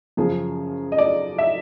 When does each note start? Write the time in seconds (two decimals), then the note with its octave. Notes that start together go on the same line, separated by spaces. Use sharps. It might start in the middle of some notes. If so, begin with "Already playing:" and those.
0.17 F#2 C#3 F3 G#4
0.92 D#5
0.98 D5
1.38 E5